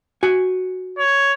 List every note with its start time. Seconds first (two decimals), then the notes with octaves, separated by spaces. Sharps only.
0.23 F#4 G#5
0.98 C#5